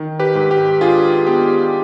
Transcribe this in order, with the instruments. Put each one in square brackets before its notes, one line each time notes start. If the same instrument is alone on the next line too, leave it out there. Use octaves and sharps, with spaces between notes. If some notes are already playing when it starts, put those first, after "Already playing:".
Already playing: [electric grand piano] D#3
G4 B4
G#2
G4
D4 F4 G#4
B3 G4